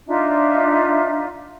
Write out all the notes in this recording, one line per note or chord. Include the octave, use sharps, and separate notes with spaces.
D4 D#4 F4 E5